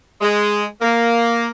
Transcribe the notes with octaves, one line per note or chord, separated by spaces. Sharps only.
G#3
A#3